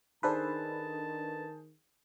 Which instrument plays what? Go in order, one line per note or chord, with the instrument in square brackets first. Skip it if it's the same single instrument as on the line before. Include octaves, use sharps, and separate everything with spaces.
[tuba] D#3 [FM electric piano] D4 A4 B4 [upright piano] D#4 G#4 C5 [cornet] A5